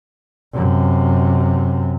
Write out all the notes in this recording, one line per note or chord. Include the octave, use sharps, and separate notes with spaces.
F#2 C3